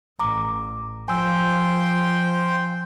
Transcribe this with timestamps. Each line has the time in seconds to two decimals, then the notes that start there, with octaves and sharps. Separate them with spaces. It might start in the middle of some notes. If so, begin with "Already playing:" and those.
0.19 A1 A#5 D6
1.08 F3 C5 G5 G#5 C6 E6